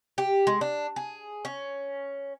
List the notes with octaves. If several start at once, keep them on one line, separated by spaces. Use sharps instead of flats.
G4
G#3
D4
G#4
C#4